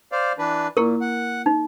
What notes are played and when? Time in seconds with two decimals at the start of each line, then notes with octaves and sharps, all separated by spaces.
0.12 C5 D5 F5
0.38 E3 D4 B4
0.77 A#2 A#3 E4 A#4 C#6
1.01 F#5
1.46 D#4